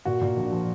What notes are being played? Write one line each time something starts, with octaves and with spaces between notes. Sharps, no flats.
A#2 F#4
A#2
A#1
F3